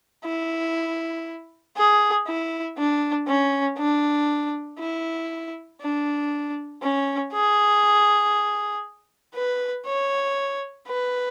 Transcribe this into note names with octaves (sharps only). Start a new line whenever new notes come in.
E4
G#4
E4
D4
C#4
D4
E4
D4
C#4
G#4
B4
C#5
B4